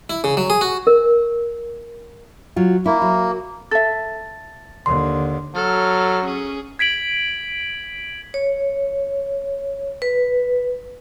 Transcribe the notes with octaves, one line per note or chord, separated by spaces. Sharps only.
E4
C#3
F#3
G#4
F#4
A#4
F#3 F4
A#3 E4
F#3
A4 E5 A6
D#2 D3 C6
F#3 A4 F6
C#4 G#4
G#6 B6 D7 F#7
C#5
B4